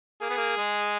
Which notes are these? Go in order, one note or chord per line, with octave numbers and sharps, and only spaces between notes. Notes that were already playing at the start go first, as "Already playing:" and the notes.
A#3 G#4
B3
A#3
G#3